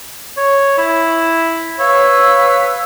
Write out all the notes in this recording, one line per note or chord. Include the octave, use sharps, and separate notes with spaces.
C#5
E4
B4 C#5 F5 E6